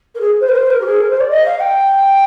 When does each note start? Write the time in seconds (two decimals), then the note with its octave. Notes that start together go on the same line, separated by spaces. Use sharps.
0.14 A#4
0.20 G#4
0.40 C5
0.48 A#4
0.55 C5
0.70 A#4
0.81 G4
0.85 G#4
1.00 A#4
1.10 C5
1.20 D5
1.29 D#5
1.45 F5
1.60 G5